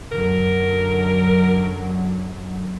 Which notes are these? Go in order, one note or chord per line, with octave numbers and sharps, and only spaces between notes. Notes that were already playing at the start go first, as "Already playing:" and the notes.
F#2 D3 F#3 A#4